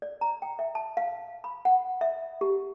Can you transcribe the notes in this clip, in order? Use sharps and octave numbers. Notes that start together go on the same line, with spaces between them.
D5
A#5
G5
E5
A5
F5
B5
F#5
E5
G4